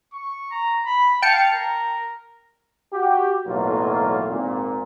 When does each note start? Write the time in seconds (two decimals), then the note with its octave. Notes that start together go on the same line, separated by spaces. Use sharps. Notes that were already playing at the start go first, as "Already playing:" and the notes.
0.13 C#6
0.51 A#5
0.85 B5
1.22 F5 G5 A5 C#7
1.54 A#4
2.93 F#4 G4
3.47 B1 E2 A2 F#3 A#3 F4
4.29 G#1 A#2